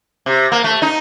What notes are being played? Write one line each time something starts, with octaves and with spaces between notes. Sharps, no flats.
C3
A#3
A3
D#4